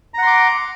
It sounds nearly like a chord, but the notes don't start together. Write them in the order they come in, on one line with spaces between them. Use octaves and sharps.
A#5 F#5 C6 D6